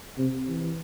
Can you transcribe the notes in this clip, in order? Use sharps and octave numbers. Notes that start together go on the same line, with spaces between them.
C3
E3